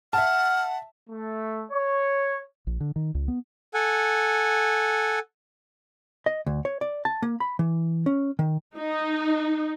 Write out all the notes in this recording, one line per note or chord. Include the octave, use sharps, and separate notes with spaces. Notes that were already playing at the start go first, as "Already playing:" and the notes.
E5 F#5 A5 F6
A3
C#5
A#1
D3
D#3
C#2
B3
A4 F#5 G#5
D#5
D2
C#5
D5
A5
A#3
B5
E3
C#4
D#3
D#4